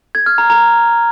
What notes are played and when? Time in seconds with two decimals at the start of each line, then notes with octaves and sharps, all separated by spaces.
0.15 G#6
0.26 F6
0.38 A#5
0.50 A#5